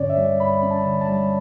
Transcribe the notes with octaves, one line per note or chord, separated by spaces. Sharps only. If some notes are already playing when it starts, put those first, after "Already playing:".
Already playing: G2 D3 C#4 C#5 D5
E5
G3
G2 B5
C#4
A5
D3
A5
G3